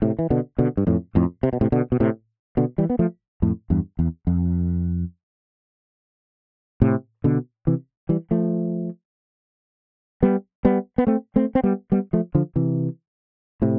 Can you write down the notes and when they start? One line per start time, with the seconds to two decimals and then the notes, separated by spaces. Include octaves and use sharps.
0.02 A2 C3
0.19 E3
0.30 B2 D3
0.59 B2 D3
0.77 G2
0.87 F2 A2
1.15 F2 A2
1.43 C3
1.53 B2
1.61 A2 C3
1.72 B2 D3
1.92 B2
2.00 A2 C3
2.57 B2 D3
2.78 E3 G3
2.90 B3
2.99 F3 A3
3.42 F2 A2
3.70 E2 G2
3.99 E2
4.27 F2
6.82 A2 C3
7.24 B2 D3
7.67 C3 E3
8.09 E3 G3
8.31 F3 A3
10.23 G3 B3
10.65 G3 B3
10.98 B3
11.07 A3 C4
11.36 A3 C4
11.55 C4
11.63 G3 B3
11.92 G3 B3
12.13 F3 A3
12.35 D3 F3
12.56 C3 E3
13.62 A2 C3